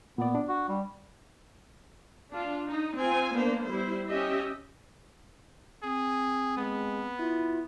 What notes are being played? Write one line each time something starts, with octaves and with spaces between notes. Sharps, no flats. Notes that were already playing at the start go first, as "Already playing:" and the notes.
A#2 B3 D5
D4
F#4
G3
D4 F4
D#4
C4 F4 G#5
A#3 B3 D4 C5
G3 E4 C5
C#4 G4 D#5 E5
C4 G#4
G#3 B3
E4 F4